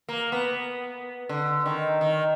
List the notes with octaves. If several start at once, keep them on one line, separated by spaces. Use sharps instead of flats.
A#3
B3
D3
D#3
D#3